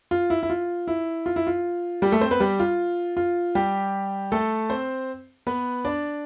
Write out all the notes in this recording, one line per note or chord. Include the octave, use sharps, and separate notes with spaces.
F4
E4
E4
F4
E4
F4
E4
F4
G3 G4
A3 A4
C4 C5
B3 B4
G3 G4
F4
F4
G3 G4
A3 A4
C4 C5
B3 B4
D4 D5